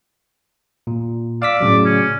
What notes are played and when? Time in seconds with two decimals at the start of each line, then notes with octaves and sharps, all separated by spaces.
0.87 A#2
1.42 D5 F5 E6 B6
1.60 A2 C#3 F#3
1.85 C#4